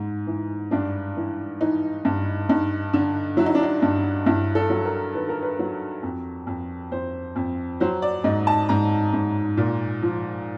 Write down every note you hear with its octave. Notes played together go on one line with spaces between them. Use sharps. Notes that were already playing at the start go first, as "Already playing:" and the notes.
Already playing: G#2
E3
G2 D4
E3
E3 D#4
G2
G2 D#4
D3
F#3 E4
D#4
D4
D#4
G2
G2 E4
A4
F#3
A#4
D#3 B4
A#4
B4
F#3
F2
F2
F2 C5
F2
F#3 C5
D5
G#2 D#5
A5
G#2 A#5
G#2
A#2
F3